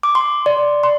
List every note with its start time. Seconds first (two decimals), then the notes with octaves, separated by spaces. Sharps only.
0.03 D6
0.15 C6
0.46 D5
0.83 C6